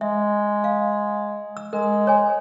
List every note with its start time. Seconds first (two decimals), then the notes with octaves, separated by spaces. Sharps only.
0.01 G#3 E5
0.64 F5
1.57 E6
1.73 G#3 A#4
2.07 C#5 G#5